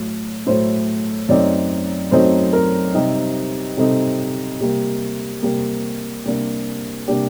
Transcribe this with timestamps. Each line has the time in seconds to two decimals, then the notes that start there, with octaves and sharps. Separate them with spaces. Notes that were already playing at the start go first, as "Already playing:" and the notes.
Already playing: A2 F#3 A3
0.46 A2 F#3 A3 C5
1.29 F#2 F#3 A3 C4 D#4 D5
2.11 F#2 F#3 A3 C4 D#4 C5
2.53 A#4
2.94 C3 G3 C4 D#4
3.77 C3 G3 C4 D#4 A4
4.60 C3 G3 A#3
5.43 C3 G3 A#3 G4
6.25 C3 G3 A#3 D4
7.08 C3 G3 A#3 D4 G4